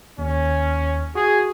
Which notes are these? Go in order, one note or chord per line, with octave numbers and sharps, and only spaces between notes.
D#2 C#4
F#4 G#4